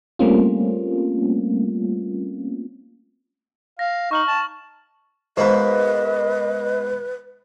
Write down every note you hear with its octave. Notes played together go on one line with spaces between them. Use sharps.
G3 A3 A#3 C4 C#4 F4
F5 A#6
D#4 C#6 F6 F#7
A5
G#2 B2 A#3 B4 C5 D#5 B5